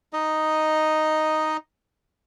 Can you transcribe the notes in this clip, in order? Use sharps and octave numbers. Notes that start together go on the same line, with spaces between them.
D#4 D#5